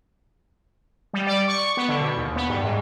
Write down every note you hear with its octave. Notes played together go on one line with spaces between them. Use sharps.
G3
D5
C#6
B3
D3
B2
D#2
B3
G2
G#2